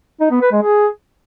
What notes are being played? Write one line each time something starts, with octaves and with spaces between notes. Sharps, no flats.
D#4
B3
B4
G#3
G#4